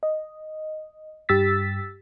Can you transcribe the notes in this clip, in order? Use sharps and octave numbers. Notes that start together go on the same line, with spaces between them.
D#5
G2 G4 E6 A6 B6